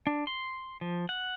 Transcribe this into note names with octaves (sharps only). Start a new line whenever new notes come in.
D4
C6
F3
F#5